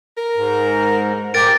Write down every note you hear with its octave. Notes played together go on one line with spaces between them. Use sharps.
A#4
G#2
G#2 G4 A#4 A6 D7